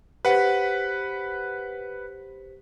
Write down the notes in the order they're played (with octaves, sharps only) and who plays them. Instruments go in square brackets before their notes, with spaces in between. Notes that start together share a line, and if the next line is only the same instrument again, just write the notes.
[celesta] G4 C5 B6 [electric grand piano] B4 F#5